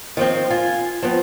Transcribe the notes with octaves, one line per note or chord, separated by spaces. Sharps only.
D#3 F3 C4
F4 G#5
F3 B3 C4